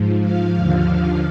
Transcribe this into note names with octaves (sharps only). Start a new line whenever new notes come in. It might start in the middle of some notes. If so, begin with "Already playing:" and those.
Already playing: G#2 F3
F5
D#2 D3 F3